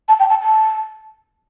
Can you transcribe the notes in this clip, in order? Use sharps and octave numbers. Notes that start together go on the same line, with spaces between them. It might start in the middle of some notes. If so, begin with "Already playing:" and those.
A5
G5
A5
A5